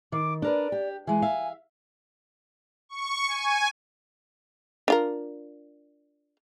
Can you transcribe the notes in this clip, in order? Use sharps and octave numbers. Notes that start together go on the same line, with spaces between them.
D#3 D6
D4 A#4 B4 D5
G4
E3 G#3 G#5
E5 F5
C#6
G#5
D4 F4 A#4